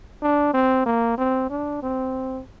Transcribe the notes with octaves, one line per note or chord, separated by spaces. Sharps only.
D4
C4
A#3
C4
D4
C4